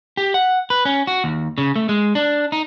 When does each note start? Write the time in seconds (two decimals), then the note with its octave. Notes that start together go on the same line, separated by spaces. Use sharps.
0.17 G4
0.34 F#5
0.70 B4
0.85 C#4
1.07 F#4
1.24 D#2
1.58 C#3
1.76 A3
1.89 G#3
2.15 D4
2.52 D#4